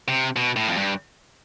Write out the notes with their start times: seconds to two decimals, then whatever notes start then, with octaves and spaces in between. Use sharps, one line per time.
0.08 C3
0.36 B2
0.56 A2
0.68 F2
0.77 G2